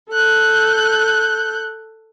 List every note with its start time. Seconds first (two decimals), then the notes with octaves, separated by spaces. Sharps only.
0.12 A4 F#6 G6